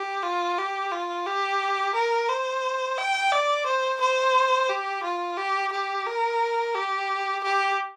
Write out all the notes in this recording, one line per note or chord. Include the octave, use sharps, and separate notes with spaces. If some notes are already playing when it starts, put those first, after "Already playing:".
Already playing: G4
F4
G4
F4
G4
A#4
C5
G5
D5
C5
C5
G4
F4
G4
G4
A#4
G4
G4